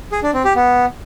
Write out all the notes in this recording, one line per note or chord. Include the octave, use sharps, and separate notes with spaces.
G#4
D4
C4
G4
B3